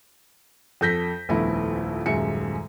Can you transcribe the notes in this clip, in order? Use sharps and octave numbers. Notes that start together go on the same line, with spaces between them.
F2 A4 G6 A#6 B6
D#1 A#1 F2 A3 B3 E4
D#1 F#2 G#3 E5 C#7